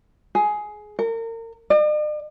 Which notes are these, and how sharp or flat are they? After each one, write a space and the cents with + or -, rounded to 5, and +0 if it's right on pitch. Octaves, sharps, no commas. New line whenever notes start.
G#4 +15
A#4 -35
D5 +45